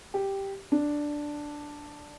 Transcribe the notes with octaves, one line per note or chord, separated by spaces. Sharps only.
G4
D4